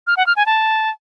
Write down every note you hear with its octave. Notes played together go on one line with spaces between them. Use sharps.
F6
F#5
F6
G#5
A5